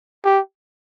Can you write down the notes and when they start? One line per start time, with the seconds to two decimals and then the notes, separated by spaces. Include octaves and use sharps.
0.25 G4